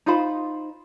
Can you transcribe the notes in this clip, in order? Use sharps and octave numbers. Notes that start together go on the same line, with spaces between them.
D#4 F4 C5 B5